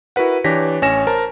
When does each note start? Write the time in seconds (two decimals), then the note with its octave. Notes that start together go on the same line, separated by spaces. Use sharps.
0.16 E4 F#4 A#4 B4 F#5
0.44 E3 D4 G4 C#5 A#6 B6
0.82 A1 C#4 C#5 G#5 A#6 E7
1.07 A#4 C5 A5 A#5